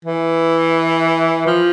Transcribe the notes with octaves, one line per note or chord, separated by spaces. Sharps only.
E3
F3